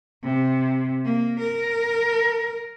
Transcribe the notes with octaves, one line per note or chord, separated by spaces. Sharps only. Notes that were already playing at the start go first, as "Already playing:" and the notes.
C3
A#3
A#4